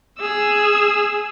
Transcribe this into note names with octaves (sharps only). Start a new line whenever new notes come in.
G#4 E6